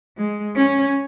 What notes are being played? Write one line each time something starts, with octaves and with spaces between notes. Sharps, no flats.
G#3
C#4